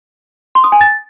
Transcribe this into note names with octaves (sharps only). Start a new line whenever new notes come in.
C6
D#6
G#5
A6